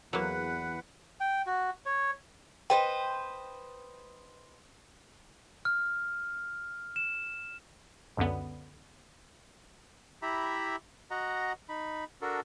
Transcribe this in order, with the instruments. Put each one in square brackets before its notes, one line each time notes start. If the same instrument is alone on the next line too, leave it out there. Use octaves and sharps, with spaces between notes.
[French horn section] E2 E3 [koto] F#3 A#3 [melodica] B4 F#5
[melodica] G5
F#4
C#5
[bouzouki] B4 C5 D#5 [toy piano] G5
[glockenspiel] F6
E7
[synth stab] C#2 F#2 D3 B3
[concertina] E4 G4 E5 A#5 B5
F#4 D#5 F#5 A#5
D#4 B5
D4 F#4 A4 A#4